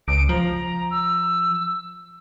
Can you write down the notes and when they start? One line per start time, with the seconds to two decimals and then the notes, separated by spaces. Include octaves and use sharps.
0.08 C#2 D7
0.29 F3 A#5
0.91 E6